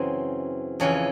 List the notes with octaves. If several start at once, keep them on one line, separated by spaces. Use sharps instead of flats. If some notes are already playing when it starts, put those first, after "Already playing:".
Already playing: F#2 C#3 E3 C4
F2 C#3 E3 C#4